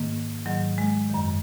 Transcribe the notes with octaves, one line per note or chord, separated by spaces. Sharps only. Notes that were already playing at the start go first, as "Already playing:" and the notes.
Already playing: G#2 D#3 A#3
G#2 D#3 F#3
G#3
F#2 D#3